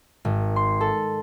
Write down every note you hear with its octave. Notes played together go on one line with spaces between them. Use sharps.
G#1
C6
A4